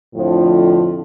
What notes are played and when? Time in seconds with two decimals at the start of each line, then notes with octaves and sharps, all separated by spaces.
0.15 F2 A2 D3 F3